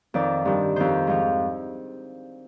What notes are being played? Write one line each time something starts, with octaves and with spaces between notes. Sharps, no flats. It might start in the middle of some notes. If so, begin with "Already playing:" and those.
F2 D#3 D5
G2 D#3
F2 D#3 C5
G#2 F3